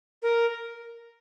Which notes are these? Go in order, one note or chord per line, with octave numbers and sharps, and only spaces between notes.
A#4